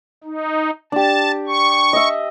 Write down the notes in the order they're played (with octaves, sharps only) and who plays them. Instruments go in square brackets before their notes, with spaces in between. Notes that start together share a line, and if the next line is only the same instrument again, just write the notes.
[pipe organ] D#4
[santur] D4 G4 [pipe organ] A5
[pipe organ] C#6
[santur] D#5 E5